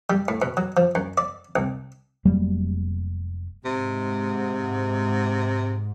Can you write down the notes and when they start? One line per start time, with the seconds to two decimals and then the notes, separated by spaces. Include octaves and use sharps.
0.10 G3
0.28 A2
0.42 B2
0.57 F#3
0.77 F3
0.95 F#2
1.18 D5
1.56 C2
2.25 F1 F#3 G3 A#3
3.65 G#2 C3